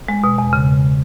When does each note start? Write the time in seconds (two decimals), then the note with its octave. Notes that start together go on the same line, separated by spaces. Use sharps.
0.08 G#3
0.24 B2
0.38 E2
0.53 C#3